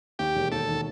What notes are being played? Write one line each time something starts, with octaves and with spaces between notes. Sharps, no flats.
D#2 G4
E1
D#2 A4
D#3